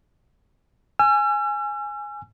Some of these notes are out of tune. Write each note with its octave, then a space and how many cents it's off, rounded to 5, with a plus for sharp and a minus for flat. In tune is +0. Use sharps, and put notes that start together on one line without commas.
G#5 +0 E6 +45